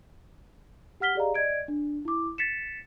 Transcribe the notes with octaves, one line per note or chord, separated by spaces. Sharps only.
G4 F#5 F6 B6 G7
G4 G#4 D5 D#5 F5 A#5
D5 D#5 G#6 D7
D4
E4 D6
A6 B6 C#7 E7